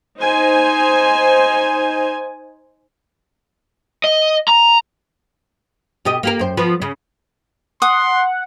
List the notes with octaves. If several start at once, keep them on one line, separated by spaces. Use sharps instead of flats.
D#4 C5 G#5
D#5
A#5
B2 G4 D#5
A#3 G4 A#4
F#2 C5
F3 B3 B4
C#3
F#5 C6 D#6